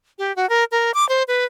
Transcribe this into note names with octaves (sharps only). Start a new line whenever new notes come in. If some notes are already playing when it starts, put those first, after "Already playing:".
G4
F#4
A#4
A#4
D6
C5
B4